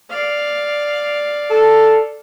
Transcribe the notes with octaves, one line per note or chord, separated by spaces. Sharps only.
D5 F5
A4